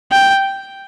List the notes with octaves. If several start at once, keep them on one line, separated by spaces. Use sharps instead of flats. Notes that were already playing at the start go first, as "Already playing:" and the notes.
G5